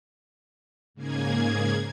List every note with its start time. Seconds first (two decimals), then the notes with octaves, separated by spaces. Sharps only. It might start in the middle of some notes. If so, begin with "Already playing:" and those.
0.94 G#2 C#3 A#3 G#4 G#6